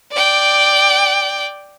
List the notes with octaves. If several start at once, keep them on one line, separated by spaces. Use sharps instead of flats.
D5 G5